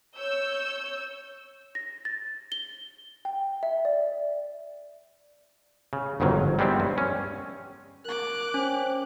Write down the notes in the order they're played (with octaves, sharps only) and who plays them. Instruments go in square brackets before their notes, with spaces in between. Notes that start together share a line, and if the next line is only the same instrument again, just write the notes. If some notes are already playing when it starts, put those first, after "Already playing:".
[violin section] C#5 E6 G6
[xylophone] A#6
A6
G7
G5
E5
D5
[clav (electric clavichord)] C#3
G1 F2 G#2 D#3 F#3
G3 G#3 B3 C4 E4
G2
C#4
[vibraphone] A#4 [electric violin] D6 F#6
[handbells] C#4 [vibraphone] C5 G5